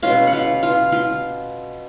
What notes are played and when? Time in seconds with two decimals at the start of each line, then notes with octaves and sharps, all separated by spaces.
0.03 B2 G#3 C#4 F4 F5
0.27 F#5
0.33 F4 F5
0.63 F4 F5
0.92 F4 F5